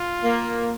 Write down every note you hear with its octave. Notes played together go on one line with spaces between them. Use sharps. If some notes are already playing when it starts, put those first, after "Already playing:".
Already playing: F4
A#3